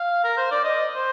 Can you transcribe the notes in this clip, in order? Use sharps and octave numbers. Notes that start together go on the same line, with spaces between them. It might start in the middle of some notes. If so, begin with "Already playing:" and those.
Already playing: F5
A#4
C5
D5
D#5
C5